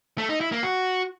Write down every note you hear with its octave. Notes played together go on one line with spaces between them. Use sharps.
A3
D#4
E4
A#3
F#4